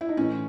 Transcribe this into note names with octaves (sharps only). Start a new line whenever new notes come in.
E4
D#4
A2 E3 C#4